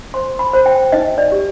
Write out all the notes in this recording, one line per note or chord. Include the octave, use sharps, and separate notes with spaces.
C5 C6
B5
C5
G5
D#4 D#5
D5
G4